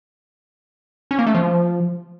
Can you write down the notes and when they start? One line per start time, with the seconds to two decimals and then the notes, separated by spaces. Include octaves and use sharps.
1.11 C#4
1.19 A#3
1.27 A3
1.34 F3